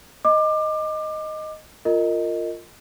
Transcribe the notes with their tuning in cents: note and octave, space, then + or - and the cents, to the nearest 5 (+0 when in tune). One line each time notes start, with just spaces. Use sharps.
D#5 +0 D6 +25
F4 +0 A#4 -25 D#5 +0